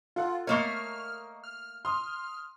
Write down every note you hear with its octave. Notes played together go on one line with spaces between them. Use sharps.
F4 A4 F#5
A3 A#3 A#4 C#5 D#5 C#6 F6
F6
C6 D#6 F6